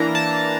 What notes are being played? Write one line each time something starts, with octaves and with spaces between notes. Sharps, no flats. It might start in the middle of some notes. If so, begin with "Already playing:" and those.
Already playing: E3 A#3 D4 A#5
A5